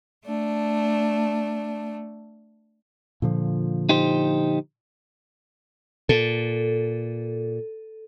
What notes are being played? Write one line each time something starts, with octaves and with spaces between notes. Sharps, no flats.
A3 D4
A#2 D3 F3
D#4 G4 C5
A#2 A4